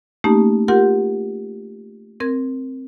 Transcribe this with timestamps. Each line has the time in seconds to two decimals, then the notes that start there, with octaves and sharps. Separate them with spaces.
0.24 A3 A#3 C#4 D#4 G4
0.68 F4 G4 A#4 F#5 C6 G6
2.20 C4 A#4 G#6